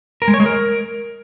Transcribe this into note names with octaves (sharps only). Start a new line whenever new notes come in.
A#4
G#3
C#5
G#3
A#4